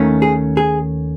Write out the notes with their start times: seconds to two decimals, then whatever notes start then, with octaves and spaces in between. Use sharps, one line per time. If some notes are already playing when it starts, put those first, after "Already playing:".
Already playing: D#2 D#3 A3 C#4
0.22 G#4
0.57 G#4